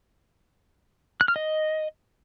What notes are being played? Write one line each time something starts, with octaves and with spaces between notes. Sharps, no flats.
F#6
F6
D#5